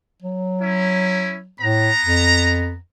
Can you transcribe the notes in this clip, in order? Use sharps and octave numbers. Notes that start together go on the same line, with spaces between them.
F#3
C#4 E4
A2 B3 A#5
F2